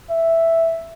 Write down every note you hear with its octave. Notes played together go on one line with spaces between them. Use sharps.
E5